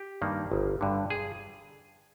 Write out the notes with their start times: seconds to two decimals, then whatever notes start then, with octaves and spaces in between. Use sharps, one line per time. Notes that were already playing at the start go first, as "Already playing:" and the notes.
Already playing: G4
0.22 G2 D#3 G3 A#3
0.52 G1
0.81 G2 D3
1.10 G#4